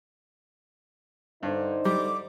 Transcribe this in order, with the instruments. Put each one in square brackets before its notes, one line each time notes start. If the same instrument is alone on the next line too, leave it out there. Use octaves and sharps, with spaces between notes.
[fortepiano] G2 [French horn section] D3 D#4 C5
[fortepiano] G3 [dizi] D6